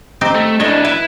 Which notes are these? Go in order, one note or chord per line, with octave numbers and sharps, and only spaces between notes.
C4 D#4 G4
A3
D4 E4 C#5 D#5
E4 B4